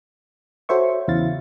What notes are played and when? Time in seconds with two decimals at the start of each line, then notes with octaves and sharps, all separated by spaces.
0.69 F#4 A4 C5 C#5 E5 C#6
1.08 E2 C#3 E4 F5 A6